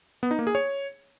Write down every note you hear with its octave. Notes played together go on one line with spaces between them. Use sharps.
B3
D#4
A#3
G#4
C#5